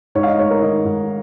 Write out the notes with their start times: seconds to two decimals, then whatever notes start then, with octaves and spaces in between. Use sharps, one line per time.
0.15 G#2 C#5
0.23 F5
0.27 D#5
0.38 G#2 C#5
0.51 A#4
0.62 D#3 D#5
0.85 G#2